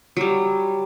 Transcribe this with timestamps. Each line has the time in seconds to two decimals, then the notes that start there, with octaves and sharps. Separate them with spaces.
0.17 F#3 G3